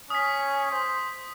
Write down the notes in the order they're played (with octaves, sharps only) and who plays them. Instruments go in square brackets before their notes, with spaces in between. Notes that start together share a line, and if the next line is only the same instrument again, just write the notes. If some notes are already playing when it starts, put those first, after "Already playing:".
[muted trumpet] C#4 [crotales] D#6 B6
[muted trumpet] C5